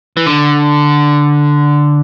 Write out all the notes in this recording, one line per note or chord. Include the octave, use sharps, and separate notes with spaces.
E3
D3